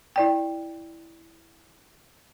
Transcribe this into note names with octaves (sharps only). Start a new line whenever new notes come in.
E4 D5 G5